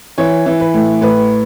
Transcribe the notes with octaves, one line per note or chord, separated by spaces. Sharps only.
E3 C#5
E3
B4
A2
A2 B4